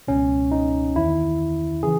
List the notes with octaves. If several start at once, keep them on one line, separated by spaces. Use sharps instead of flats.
C#2 B2 C#4
D#4
E2 D#3 E4
C#3 E3 G#4